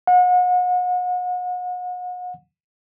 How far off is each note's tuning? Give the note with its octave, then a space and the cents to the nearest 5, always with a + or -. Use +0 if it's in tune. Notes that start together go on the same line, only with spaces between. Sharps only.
F#5 -40